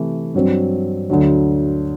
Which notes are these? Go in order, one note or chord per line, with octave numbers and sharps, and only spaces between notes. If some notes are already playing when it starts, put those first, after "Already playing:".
Already playing: C3 E3 A3
G2 F#3 C4
D2 D3 F#3